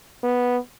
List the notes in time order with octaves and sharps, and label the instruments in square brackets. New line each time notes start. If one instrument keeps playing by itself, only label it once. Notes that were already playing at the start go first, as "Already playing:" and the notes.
[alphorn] B3